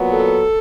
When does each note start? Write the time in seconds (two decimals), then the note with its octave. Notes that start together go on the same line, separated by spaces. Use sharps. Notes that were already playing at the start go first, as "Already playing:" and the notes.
Already playing: A#2 F#3 B3
0.13 A4